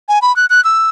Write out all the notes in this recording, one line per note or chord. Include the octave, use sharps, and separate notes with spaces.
G#5
B5
F#6
F#6
E6